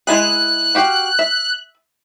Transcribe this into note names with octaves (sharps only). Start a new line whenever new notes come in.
G#3 E4 G#4 F#6
F#4 G4 F5
E5